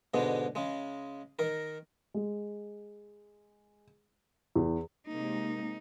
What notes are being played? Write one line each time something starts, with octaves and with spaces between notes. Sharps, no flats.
G#2 B2 D3 G#3
C#3 G#3
D#3 A#4
G#3
E2
C3 G#3 A#3 D#4